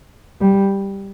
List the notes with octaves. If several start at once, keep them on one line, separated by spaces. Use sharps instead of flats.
G3